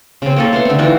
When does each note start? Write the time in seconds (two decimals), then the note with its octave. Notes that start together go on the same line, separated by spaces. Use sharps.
0.22 C#3 C4
0.36 A#3 C#4 A4
0.53 A3 B3 C6
0.65 D3 C4
0.79 E3 D#4 F4 F#4